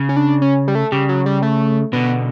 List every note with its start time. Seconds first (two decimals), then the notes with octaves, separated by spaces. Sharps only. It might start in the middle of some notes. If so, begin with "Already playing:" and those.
Already playing: C#3
0.09 C#4
0.16 D4
0.42 C#4
0.68 G3
0.75 A3
0.92 C#3 G3
1.09 F#3
1.26 G3
1.42 A3
1.93 B2 D3 B3